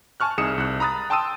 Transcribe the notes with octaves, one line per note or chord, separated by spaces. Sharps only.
G#5 A5 C#6 F6 F#6
C2 D#4 G#4 D#6 C#7 E7
C2 F#6
A#5 B5 D#6 F#6 A6
G5 A5 C6 D#6 E6 D#7